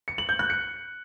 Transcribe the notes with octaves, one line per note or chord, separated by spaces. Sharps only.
C#7
F#7
G6
F#6
C#7